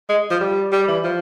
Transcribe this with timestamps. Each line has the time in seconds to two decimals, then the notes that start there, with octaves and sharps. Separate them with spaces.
0.09 G#3
0.31 F3
0.41 G3
0.72 G3
0.88 E3
1.04 F3